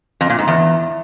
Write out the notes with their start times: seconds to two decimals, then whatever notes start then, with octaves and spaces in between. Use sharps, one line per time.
0.21 F2
0.30 A#2
0.39 G#2
0.48 E2